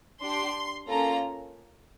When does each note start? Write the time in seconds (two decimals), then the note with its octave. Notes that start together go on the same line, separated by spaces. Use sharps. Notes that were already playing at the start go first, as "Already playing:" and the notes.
0.22 D4 G4 C6
0.88 A#3 C#4 F4 A4 A#5